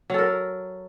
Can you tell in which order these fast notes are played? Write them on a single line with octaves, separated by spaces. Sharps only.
F#3 A4 A#4